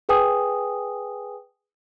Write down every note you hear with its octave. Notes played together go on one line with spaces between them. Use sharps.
G#4 B4 G5 G#5 D#6